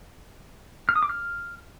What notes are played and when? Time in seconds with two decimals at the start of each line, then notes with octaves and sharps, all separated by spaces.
0.89 F6
0.96 D#6
1.03 D6
1.09 F6